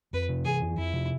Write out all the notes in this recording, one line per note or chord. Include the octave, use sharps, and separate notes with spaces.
F2 B4
C3
E3 G#4
F2
F2 E4
C3